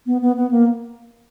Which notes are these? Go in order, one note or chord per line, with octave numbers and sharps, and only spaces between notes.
B3
B3
B3
A#3